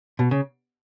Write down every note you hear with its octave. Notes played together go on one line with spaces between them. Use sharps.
B2
C#3